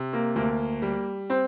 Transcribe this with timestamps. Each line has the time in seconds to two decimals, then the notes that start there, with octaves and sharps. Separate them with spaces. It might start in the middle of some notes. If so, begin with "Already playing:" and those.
Already playing: C3
0.13 A#3
0.36 D2 A#3
0.82 G3
1.30 C4